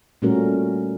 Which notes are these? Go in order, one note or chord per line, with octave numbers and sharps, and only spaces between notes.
A#2 G3 A3 C#4 F#4 A#4